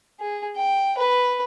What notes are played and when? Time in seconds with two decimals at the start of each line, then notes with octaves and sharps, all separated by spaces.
0.20 G#4
0.56 G5
0.97 B4